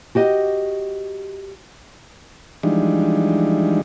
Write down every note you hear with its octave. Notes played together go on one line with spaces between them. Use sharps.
F#4 G4 D#5
E3 F3 G3 G#3 D4 D#4